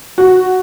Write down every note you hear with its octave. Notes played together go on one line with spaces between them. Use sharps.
F#4